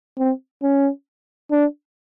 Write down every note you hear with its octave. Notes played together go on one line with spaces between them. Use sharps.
C4
C#4
D4